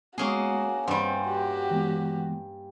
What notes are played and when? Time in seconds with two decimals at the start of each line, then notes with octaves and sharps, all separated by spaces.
0.18 G#3 A#3 B3 C#4 F#4 G#4
0.88 G2 G3 C4 F#5 G#5 C6
1.28 F#4 G4
1.71 E3 G#3 B3